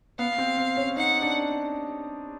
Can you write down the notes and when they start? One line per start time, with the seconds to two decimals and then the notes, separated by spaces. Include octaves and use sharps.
0.19 B3 F5
0.38 C4
0.58 C4
0.77 C#4
0.96 D#4 F#5
1.22 D4